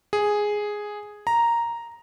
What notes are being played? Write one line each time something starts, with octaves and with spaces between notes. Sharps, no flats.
G#4
A#5